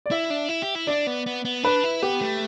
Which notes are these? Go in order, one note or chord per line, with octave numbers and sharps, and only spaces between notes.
D5
E4 E5
D4
E4
G4
E4
D4 D5
B3
B3
B3
D4 B4
E4
B3 G4
A3